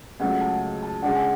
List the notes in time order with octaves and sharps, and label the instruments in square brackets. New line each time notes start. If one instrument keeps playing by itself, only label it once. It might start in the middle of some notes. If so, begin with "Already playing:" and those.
[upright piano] C#2 C#3 F#3 A3 [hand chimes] F#5
[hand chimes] A5
A5
[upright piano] C#3 G#3 D4 [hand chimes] F#5
[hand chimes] G#5